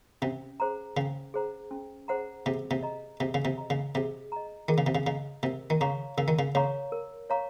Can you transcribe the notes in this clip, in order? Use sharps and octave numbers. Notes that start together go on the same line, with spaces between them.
C3 C#4
G#4 C5 F#5 A#5
C#3 C#4
G#4 C5 F#5 A#5
C#4
G#4 C5 F#5 A#5
C3 G#4
C3
D#5 A#5
C3 G#4
C#3
C3
D#5 A#5
C#3
C3 G#4
D#5 A#5
D#3 G#4
C#3
C3
C#3
C#3 D#5 A#5
C3 A#4
D#3
C#3 C#5 F5 A#5 C#6
C#3 A#4
D#3
C#3
C#3 C#5 F5 A#5 C#6
A#4
C#5 F5 A#5 C#6